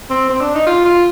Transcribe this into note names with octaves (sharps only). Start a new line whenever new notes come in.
C4
C4
D4
D#4
F4
F4